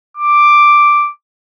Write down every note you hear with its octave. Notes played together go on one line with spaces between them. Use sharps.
D6